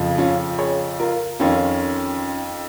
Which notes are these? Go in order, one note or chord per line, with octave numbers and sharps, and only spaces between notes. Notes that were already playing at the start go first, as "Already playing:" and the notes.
Already playing: F2 C#3 F3
C#4 F4
G#4 C#5
F4 A#4
F2 D#3 C#4 F4